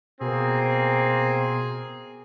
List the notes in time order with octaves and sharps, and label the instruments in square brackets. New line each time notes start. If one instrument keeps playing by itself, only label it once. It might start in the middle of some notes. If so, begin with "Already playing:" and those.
[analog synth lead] B2 [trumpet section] A#3 C4 [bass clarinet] G#4